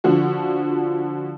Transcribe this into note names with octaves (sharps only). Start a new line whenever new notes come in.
D3 F3 F#4